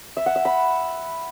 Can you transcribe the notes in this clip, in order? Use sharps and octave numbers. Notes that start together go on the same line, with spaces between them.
E5
F#5
E5
B5